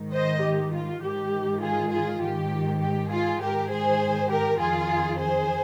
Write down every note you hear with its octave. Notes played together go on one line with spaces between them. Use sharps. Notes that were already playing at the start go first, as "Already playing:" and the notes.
Already playing: G#2 D#3
C5 D#5
G4
F4
G#2 D#3 G4
F4 G#4
F4 G#4
G#2 D#3 G4
G4
F4 G#4
G#2 D#3 G4 A#4
G#4 C5
G4 A#4
F2 D#3 F4 G#4
G#4 C5